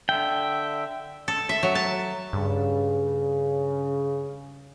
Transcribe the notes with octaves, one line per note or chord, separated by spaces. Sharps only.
D3 E5 G5
A4
E5
F#3
A5
G2 C#3